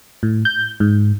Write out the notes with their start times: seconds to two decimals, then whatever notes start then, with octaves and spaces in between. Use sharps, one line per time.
0.23 A2
0.45 G6
0.80 G#2